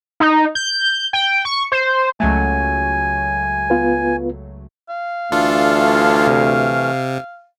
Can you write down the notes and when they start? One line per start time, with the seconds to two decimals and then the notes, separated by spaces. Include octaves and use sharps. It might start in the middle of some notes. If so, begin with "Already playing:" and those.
0.20 D#4
0.55 G6
1.13 G5
1.45 C#6
1.72 C5
2.20 C#2 F#3 A3 G#5
3.70 B3 F4 B4
4.90 F5
5.32 D2 E3 A3 D4 F4 A4 F6
6.27 C3